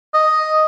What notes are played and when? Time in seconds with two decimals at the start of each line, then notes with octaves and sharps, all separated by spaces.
0.14 D#5